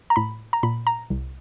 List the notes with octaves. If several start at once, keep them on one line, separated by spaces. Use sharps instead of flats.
A#5
A2 B5
A#5
A#2 B5
A#5
C2